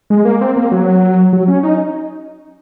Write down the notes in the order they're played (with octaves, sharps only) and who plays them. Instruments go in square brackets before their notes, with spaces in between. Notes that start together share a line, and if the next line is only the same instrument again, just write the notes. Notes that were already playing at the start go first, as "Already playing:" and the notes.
[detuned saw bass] G#3
A#3
C4
A#3
F#3
F#3
C#4
D#4